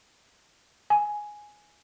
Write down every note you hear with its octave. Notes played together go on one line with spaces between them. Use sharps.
G#5